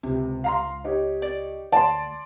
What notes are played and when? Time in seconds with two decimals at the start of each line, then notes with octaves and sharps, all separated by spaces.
0.03 C#2 C3
0.44 F5 A#5 C6
0.84 D#4 G4 C#5
1.22 D5
1.72 D2 D5 A5 C6